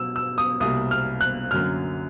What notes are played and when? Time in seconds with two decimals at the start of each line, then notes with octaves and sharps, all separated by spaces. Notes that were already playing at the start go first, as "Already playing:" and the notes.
Already playing: B2 F#3 B3 E6
0.16 E6
0.38 D#6
0.60 C2 B2 G3 A#3 D#6
0.91 F6
1.21 F#6
1.51 F#2 D3 F#3 A#3 F6